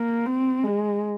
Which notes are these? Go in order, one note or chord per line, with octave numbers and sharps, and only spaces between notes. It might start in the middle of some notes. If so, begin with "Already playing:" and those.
Already playing: A#3
C4
G#3